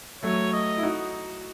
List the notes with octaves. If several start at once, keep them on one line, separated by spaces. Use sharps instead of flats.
F#3 A3 C#5
D#5
E4
D#4 F#4